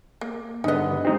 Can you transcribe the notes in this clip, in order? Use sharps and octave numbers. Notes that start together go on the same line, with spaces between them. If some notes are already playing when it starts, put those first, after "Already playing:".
A#3
G2 D3 B3 D#4 D#5
G#3 C4 D#4 G4